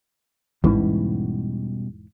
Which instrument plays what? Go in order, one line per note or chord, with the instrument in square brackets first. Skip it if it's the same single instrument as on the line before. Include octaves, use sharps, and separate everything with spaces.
[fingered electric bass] E1 G#2 E3 [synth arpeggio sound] A1 [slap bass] B2 G3 C#4